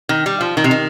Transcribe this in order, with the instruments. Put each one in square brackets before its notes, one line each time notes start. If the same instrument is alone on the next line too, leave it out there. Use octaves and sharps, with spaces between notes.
[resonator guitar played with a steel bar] D#3
G3
F3
D#3
C3
D#3